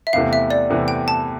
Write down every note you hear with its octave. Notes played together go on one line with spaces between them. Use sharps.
E5
E2 C3 E3 A3 F5
E5
D5
E2 C3 E3 A3
G5
A5